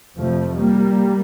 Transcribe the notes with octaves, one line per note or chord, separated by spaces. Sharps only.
F2 C3 F3 A3
G3 A#3